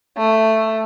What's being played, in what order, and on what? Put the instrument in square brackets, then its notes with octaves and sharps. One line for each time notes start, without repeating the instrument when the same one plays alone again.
[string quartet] A3